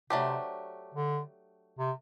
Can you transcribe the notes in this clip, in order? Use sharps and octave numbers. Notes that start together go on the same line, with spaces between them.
C3 F#3 A3 D4 G4 C5
D3
C3